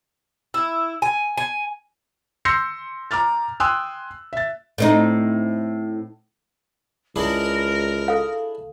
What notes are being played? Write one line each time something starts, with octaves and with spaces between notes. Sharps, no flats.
E4
G#5
G#5
C6 E6 G6 A#6 C7 C#7
A#5 D6 F6 A6
G5 G#5 C6 D#6 E6 F#6
E5 A6
A2 C4 D#4
C#2 D4 E4 G#4 A#4
A4 F5